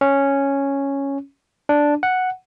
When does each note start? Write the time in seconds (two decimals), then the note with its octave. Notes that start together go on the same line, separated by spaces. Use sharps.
0.01 C#4
1.69 D4
2.03 F#5